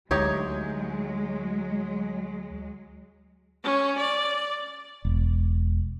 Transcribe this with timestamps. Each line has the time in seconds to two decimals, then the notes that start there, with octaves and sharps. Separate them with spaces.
0.11 D2 F#3 G#3 D#4 G4 C#5
3.63 C#4
3.98 D5
5.05 E1